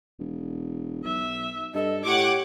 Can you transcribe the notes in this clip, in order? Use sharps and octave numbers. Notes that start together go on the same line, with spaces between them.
E1
B1 E5
G2 A4 D#5
A2 G4 C#5 F#5 D6